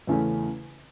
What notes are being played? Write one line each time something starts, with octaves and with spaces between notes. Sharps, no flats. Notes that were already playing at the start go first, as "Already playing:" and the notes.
E2 C#3 E3 A3 C#4